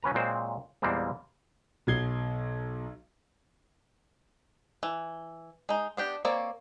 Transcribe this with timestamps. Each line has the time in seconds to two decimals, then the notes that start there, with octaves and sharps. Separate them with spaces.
0.03 F#3 C#4 B4 A#5
0.14 A#2 F#3 G#3 C4 C5
0.82 E2 A#2 G3 G#3 A#3 C4
1.87 B1 B2 F#3 G#6 C7 G7
4.83 E3
5.69 G#3 D#4
5.97 B3 D4 G4
6.25 A#3 C4 C#5 D5